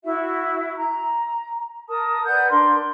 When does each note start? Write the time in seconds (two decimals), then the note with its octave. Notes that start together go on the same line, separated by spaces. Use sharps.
0.04 E4 F#4 E5
0.76 A#5
1.88 A#4 A5 D#6
2.26 B4 D5 F#5 G6
2.49 D4 A#4 C6